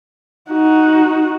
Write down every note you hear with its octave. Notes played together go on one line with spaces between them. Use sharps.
D#4 F#4